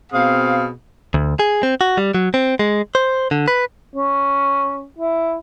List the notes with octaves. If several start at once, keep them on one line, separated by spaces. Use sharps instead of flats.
B2 C4 G#4 F5
D2
G#4
C4
F#4
G3
F#3
C4
G#3
C5
D3
B4
C#4
E4